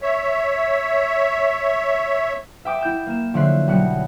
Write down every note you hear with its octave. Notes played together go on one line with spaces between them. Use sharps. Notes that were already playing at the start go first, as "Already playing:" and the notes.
C#5 E5
E5 G5 D6 D#6
E4 G5 G6 E7
A#3 E7
D3 F3 C#5 E5 F#6 C7
B1 G3 F#4 F#6 C#7